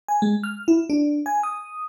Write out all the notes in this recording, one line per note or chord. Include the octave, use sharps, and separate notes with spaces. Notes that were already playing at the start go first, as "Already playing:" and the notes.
G#5
G#3
F6
E4
D4
G#5
D#6